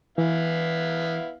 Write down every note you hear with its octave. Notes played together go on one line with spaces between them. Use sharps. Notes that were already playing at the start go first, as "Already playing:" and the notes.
E3 B3 E4 F5